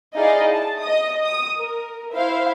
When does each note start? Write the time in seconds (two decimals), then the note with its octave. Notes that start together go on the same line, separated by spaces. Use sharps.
0.15 D#4 E4 G#4 D5 D#5 F5
0.51 A5
0.81 D#5 D#6
1.23 D#6
1.58 A#4
2.12 E4 C5 E5 F5